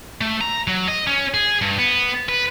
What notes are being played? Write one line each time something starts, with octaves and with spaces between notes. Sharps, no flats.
A3
A#5
F#3
D#5
C#4
G#4
G2
B3
B4